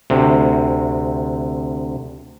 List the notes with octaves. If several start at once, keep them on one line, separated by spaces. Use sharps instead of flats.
D2 C3